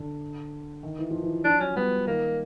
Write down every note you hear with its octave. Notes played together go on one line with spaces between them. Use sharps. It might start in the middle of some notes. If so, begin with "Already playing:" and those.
Already playing: D3
D#3
E3
F3
E3
F3 D4
F#3 C#4
G3 B3
D#3 A#3